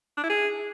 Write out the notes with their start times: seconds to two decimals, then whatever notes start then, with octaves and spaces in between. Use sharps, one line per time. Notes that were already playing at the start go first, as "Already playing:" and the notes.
0.17 D4
0.23 E4
0.30 G#4